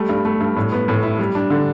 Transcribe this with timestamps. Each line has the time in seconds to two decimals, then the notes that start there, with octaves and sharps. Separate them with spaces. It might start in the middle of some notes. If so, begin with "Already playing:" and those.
Already playing: G3 A3
0.09 G2
0.25 A3
0.41 G2
0.56 A2
0.72 B3
0.88 A2
1.03 E4
1.19 G3
1.35 D4
1.50 D3